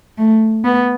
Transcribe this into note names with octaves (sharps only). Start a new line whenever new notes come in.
A3
B3